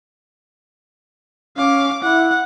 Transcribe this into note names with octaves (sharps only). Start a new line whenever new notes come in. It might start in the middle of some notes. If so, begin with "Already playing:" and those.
C#4 F5 D6
E4 F#5